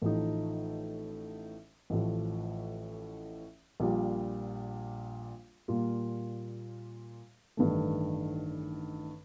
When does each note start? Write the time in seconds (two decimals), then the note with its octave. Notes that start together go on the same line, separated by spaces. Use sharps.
0.02 A1 A2 F3 A3 D#4
1.90 A1 A2 F3
3.80 A#1 A#2 G3
5.68 A#2 G3 A#3 F4
7.57 A1 G2 D#3 A3